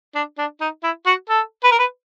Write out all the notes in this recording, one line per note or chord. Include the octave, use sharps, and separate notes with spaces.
D4
D4
D#4
E4
F#4
A4
B4
A#4
B4